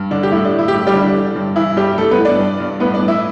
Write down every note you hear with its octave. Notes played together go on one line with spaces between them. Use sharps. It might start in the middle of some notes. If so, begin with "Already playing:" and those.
Already playing: G2
D3 D4
G4
A2 E4
D4
A2
E4
G4
G2 E4
G3 G4
D3
D4
E3
G2
E3 E4
G2 G3 G4
G2 A3 A4
B3 B4
E3
D4 D5
G2
G2
A2 B3 B4
D4 D5
E3
E4 E5